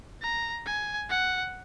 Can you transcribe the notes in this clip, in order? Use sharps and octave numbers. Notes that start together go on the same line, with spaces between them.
A#5
G#5
F#5